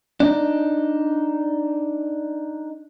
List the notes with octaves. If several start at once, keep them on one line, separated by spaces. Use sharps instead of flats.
D4 D#4